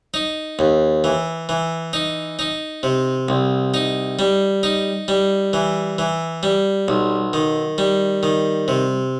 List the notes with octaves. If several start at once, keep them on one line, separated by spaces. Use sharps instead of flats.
D#4
D#2
E3
E3
D#4
D#4
C3
C2
D#4
G3
D#4
G3
E3
E3
G3
B1
D#3
G3
D#3
C3